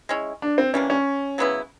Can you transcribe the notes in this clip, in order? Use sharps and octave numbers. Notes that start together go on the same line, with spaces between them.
G#3 C#4 E4
D4
C4
E3 G3 A#3 C#4 D4
C#4
C#3 F#3 B3 E4